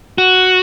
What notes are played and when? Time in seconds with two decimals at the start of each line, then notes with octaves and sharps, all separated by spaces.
0.18 F#4